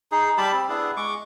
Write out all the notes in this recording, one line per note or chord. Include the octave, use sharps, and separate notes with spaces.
D#4 G#4
G3 G4 A5 B5
C4
B3 D4 E4 G#4
G#3 C#6 D6